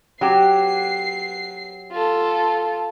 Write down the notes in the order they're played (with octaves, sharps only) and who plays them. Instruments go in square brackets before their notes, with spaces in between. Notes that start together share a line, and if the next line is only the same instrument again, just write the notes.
[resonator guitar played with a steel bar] F#3 G4 [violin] C7
[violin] F4 A4